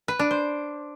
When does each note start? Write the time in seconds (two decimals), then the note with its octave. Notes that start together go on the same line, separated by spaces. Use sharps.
0.08 B4
0.19 D4
0.31 C5